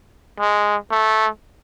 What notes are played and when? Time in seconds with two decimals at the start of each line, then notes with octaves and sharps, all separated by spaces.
0.39 G#3
0.91 A3